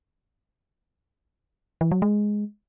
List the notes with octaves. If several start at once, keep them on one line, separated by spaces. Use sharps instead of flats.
E3
F#3
G#3